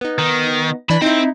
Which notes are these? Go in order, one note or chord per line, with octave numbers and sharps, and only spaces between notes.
B3 D#4
D#3
E3 D4 B5
C4 D#4 E4